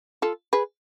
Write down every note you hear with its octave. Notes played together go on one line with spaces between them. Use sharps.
F4 A4
G#4 B4